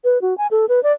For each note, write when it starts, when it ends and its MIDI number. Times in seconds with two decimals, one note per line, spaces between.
0.04 0.21 71
0.22 0.36 66
0.38 0.47 80
0.51 0.65 69
0.69 0.82 71
0.83 0.92 74